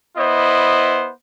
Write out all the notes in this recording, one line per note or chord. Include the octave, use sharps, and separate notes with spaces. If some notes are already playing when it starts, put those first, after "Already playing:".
B3 E4 C5 D#5